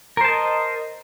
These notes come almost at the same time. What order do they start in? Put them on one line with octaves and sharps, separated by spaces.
A#4 C5 A5 D#5